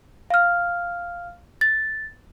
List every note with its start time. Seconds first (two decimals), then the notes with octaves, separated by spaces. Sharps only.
0.30 F5 F6
1.61 A6